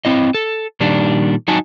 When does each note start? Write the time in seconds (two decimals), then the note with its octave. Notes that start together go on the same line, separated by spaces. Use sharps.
0.05 C4 E4 D#5
0.34 A4
0.80 A#2 D#3 G3 D4
1.48 F#3 D#4 F#4 G#5 A5